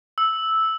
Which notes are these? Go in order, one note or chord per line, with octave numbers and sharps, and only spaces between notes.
E6